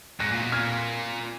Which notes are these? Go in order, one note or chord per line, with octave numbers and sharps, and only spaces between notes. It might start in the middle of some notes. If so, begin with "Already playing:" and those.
G#2 F#6 A#6
A#2
B2
A#2 F6 G#6